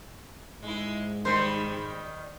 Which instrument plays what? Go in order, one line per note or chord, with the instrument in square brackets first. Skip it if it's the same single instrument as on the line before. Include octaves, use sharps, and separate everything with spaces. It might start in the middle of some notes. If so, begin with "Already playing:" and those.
[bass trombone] G#2 [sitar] G#3 E4
[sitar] D#3 G3 D#4 [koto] C5